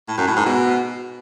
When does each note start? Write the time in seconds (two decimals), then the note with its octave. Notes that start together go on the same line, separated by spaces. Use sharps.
0.08 A2
0.18 F#2
0.27 A2
0.37 G#2
0.46 B2